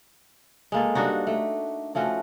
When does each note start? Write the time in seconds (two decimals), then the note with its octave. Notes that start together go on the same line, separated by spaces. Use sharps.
0.72 G#3 A#3 A4
0.95 G2 D4 D#4 F#4
1.27 A3
1.95 F3 A3 C#4 F#4